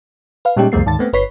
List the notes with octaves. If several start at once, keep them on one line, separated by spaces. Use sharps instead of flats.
B4 F5
A#2 G3 G#3 C#4 D#4 G4
C#2 F#2 E3 G#3 A#3 C7
D2 G#2 D#3 A5 A6
A3 B3 C4
G1 B4 C#5 B6 C7